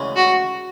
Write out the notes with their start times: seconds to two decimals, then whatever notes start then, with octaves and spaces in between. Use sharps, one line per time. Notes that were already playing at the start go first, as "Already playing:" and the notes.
Already playing: D2 C#3 E3 G#3 C#4
0.16 F#4